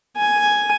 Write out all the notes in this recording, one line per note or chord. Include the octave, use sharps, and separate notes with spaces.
G#5